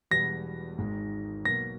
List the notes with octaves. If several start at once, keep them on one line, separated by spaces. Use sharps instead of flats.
E1 E2 B2 G3 B3 A#6
G#1 G#2 D#3 G#3
B2 F#3 A#3 A#6